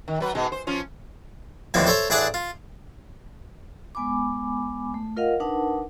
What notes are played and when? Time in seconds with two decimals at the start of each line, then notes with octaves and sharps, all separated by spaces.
0.08 D#3
0.20 F#3 B4
0.35 G#2 B2 G#3
0.52 C5
0.67 F3 C#4 F4
1.74 D#2 A2 D3 E3 F3 C4
1.87 A4 C5 C#5 E5
2.10 A1 D4 G#4 E5 F#5 A5
2.34 F4
3.95 G#3 B3 G#5 B5 D6
4.94 A3
5.17 F4 A#4 D#5 F5 F#5
5.40 D4 D#4 A#4 B4 F#5 A5